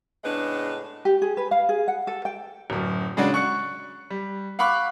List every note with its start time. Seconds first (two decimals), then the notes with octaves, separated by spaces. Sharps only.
0.24 A2 C#3 G#3 B3 D4
1.05 G4
1.22 G#4
1.37 B4
1.51 F5
1.69 G#4
1.88 F#5
2.07 A4
2.25 G5
2.70 D1 F#2
3.17 C#3 G#3 C#4 D4 F#4
3.34 C#6 F#6 C#7
4.10 G3
4.59 F5 F#5 B5 C#6 D6 F#6